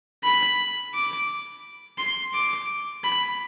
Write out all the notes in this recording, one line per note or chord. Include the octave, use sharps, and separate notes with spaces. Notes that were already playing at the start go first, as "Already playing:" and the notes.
B5
D6
C6
D6
B5